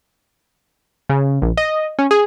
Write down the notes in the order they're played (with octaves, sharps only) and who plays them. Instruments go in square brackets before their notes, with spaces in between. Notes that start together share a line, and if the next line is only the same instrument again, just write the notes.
[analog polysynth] C#3
A#1
D#5
C#4
G#4